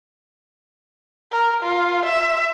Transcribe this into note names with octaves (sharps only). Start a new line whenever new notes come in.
A#4
F4
E5